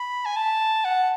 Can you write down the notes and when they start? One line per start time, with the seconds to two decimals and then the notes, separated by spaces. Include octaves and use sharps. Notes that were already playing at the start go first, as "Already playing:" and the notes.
Already playing: B5
0.25 G#5
0.36 A5
0.85 F#5